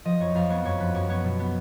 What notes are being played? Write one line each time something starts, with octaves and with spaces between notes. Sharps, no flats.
F3 D#5
F2 C#5
F2 F5
B3 C#5
F#2 C#5
F3 B4
F#2 C#5
B3 C#5
B2
B3